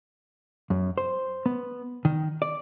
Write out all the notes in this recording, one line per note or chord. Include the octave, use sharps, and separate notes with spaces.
F#2
C5
B3
D#3
D5